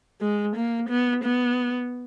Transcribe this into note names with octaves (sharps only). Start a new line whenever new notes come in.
G#3
A#3
B3
B3